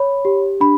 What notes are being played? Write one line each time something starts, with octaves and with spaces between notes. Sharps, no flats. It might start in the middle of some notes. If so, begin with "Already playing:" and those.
Already playing: C#5 B5
G4
D4 B5